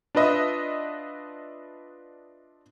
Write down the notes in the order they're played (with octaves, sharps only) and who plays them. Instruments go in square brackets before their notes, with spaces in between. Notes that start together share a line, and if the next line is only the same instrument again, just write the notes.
[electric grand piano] D4 F4 B4 D#5 E5